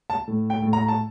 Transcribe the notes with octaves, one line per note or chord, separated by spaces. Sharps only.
A5
A2
G5
A2
A#5
A5